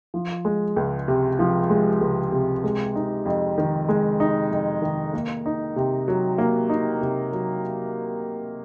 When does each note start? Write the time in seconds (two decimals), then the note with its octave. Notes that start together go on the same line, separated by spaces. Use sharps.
0.14 F3
0.45 G#3
0.76 C#2
1.08 C3
1.39 F3
1.70 G#3
2.01 C#2
2.32 C3
2.64 G#3
2.95 D#4
3.26 F2
3.58 D#3
3.89 G#3
4.20 D#4
4.51 F2
4.82 D#3
5.13 A#3
5.46 D#4
5.76 C3
6.08 F#3
6.38 A#3
6.69 D#4
7.01 C3
7.33 F#3